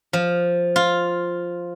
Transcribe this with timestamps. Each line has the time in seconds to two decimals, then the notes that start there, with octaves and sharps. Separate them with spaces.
0.13 F3
0.76 F4